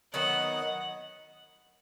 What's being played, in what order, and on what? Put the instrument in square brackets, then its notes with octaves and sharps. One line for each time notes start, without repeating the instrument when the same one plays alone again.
[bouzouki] D#3 F#3 B3 D#4 [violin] F#5